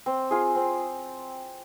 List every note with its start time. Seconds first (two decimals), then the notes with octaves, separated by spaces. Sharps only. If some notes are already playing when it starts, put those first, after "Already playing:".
0.06 C4
0.31 F4 G#4
0.55 C4